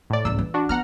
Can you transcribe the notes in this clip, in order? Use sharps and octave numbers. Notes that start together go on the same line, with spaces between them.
A2 D5
C#2 G#2 E6
E3
D4 F#4
B3 F#5 A#5 F6